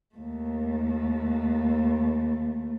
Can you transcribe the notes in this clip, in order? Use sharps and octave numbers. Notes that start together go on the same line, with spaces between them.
D#2 A3